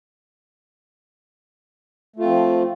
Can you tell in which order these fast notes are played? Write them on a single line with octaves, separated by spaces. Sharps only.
A3 F4 C4 F3